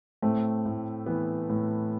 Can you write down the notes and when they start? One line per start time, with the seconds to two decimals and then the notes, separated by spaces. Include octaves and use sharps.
0.22 A2 A3 C4
0.66 A2
1.06 E3 B3
1.50 A2